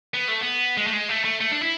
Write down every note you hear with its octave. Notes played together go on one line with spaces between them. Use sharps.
B3
A3
B3
G#3
A3
G#3
A3
A3
A3
D4
E4